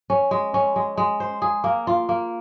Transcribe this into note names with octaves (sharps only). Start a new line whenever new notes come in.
C#4
G#3
C#4
G#3
G#3
C5
G#4
A#3
F4
A#3